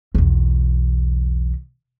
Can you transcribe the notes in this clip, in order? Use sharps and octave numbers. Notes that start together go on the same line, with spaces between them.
B1 E2